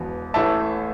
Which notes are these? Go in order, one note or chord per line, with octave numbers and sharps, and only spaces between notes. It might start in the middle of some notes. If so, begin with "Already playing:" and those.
Already playing: E1 E2 B2 B3
A1 A2 E3 A3 E5 A5